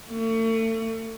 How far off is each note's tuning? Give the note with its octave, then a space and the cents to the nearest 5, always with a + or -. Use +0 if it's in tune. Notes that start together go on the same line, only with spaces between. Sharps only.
A3 +35